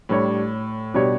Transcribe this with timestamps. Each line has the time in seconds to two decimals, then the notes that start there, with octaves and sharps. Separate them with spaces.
0.09 A2 G3 D4 G4 C#5
0.94 B2 G3 D4 G4 C#5